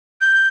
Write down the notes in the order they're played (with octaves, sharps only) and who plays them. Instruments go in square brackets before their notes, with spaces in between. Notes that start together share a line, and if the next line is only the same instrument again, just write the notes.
[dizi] G6